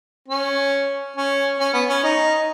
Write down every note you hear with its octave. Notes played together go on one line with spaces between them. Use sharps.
C#4
C#4
C#4
B3
C#4
D#4